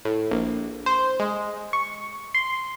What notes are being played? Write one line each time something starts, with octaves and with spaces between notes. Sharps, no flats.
A2
A#1
C5
G#3
C#6
C6